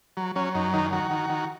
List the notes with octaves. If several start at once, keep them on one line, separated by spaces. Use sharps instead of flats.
F#3
F#3 C#4
F#2 D#4
D#3 D#4
D#3 F#4
D#3
D#3